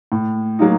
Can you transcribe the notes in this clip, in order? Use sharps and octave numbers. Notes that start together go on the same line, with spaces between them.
A2
F#3 A#3 D#4